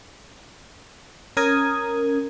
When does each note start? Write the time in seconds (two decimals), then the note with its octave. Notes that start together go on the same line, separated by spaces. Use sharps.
1.37 C#4 A#4 D#6 G#6